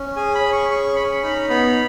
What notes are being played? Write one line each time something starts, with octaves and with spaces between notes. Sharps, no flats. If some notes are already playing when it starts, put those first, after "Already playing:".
Already playing: C#4
G#4 G#5
B5
C#4
C#6
G#4 C#6
C#4 B5
C#6
B5
D#4 B5
B3 B5